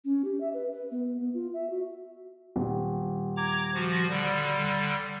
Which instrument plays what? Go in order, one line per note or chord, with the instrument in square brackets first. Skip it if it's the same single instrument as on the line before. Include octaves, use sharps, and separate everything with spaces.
[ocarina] C#4
G4
E5
B4
B4
B3
B3
F4
E5
F#4
[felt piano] D#1
[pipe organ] A#5 D6 G#6
F3 F#4
D3 G3